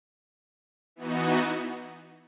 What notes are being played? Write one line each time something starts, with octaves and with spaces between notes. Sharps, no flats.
E3 B3 D#4 F#4